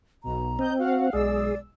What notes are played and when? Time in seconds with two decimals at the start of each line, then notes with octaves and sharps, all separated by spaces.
0.24 B1 B2 A#5
0.59 C4 D#5 G6
0.79 F#4 F5 F#5
1.13 B1 G#3 G#4 D5 E6